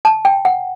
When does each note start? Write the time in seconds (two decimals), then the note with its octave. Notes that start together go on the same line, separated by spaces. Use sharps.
0.05 A5
0.25 G5
0.45 F#5